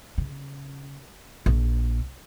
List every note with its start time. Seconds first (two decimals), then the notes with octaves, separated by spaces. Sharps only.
0.18 C#3
1.46 A#1